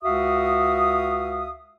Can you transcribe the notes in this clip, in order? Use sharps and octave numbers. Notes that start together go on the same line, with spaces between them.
C#2 F#4 E5 F5 D#6